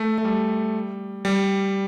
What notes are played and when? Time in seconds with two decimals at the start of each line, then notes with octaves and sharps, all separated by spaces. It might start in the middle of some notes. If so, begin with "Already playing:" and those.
Already playing: A3
0.18 A3
0.25 G3
1.25 G3